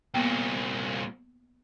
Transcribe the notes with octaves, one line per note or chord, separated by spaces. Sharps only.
C2 A#2 A#3 B3 G5